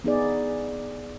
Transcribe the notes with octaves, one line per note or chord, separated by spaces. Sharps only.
B3 D#4 G#4 D5